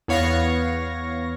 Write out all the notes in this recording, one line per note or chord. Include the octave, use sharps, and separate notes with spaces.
E2 B3 C#5 F5 C#6 A#6